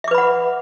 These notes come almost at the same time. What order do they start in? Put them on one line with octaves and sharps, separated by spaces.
E5 D6 B4 B5 F#5